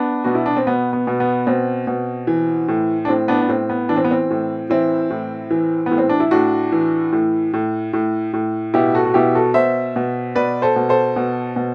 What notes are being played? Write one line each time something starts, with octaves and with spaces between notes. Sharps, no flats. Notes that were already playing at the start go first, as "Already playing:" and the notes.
Already playing: B3 D4
B2 F#4
E4
D4
C4
B2 B3
B3
B2
B3
B2 C4
B2
E3
A2
D4
A2 C4
B3 D4
D4
A2 C4
B3
E3 D4
C4
B3
C4
A2
E3 C4 E4
A2
E3
A2 B3
C4
D4
E4
A2 D4 F#4
E3
A2
A2
A2
A2
B2 E4 G4
F#4 A4
F#4
B2 E4 G4
F#4 A4
B2 C5 E5
B2
B2 B4 D5
A4 C5
B2
A4 C5
B2
B2